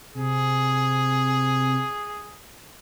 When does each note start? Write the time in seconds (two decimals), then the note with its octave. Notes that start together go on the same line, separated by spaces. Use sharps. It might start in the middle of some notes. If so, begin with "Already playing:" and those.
0.15 C3 G#4